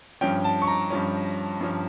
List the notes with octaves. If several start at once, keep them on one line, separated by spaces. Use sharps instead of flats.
G2 F3 C#4 G5
A5
C#6
A#5
G2 F3 C#4
G2 F3 C#4